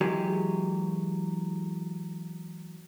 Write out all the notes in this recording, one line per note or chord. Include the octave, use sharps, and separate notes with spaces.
E3 F#3 G#3 A#3 G4 G#4